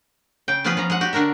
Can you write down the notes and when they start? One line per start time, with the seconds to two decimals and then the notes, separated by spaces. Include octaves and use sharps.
0.48 C#3 G5
0.64 F3 B3 C#4 F4 G#4 B4
0.77 F3 C#4 A#5
0.90 G#3 F#5
1.01 F#4 G4
1.13 D3 D4 F#4 A#4 E5